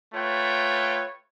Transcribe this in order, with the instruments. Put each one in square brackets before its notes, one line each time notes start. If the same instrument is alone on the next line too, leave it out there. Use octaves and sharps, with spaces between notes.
[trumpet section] A3 F4 B4 C#5 G5